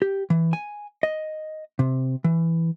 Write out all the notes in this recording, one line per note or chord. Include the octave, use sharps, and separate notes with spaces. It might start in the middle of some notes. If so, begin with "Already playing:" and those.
G4
E3
G#5
D#5
C3
E3